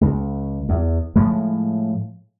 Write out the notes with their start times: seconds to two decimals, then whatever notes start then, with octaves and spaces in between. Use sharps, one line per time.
0.01 C#2
0.69 E2
1.15 A2 F3 G#3